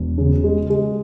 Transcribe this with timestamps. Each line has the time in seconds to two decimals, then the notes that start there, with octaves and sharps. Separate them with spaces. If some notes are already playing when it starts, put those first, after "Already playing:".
Already playing: E1
0.18 C#3
0.44 G#3
0.70 G#3